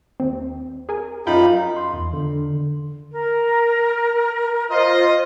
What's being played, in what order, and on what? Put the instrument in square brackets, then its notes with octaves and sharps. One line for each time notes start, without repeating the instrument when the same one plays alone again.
[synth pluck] D#2 C4
G#4 A#4 G#5
[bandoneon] F#2 D#4 B5 [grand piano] F4 [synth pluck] G5 G6
[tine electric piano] C6
E2
D3
[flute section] A#4
[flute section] F4 C5 [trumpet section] D#5